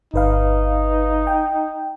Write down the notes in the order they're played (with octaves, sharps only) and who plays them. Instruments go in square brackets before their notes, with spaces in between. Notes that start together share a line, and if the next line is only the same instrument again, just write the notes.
[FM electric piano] G1 B4 F5 [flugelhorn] D#4
[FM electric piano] G5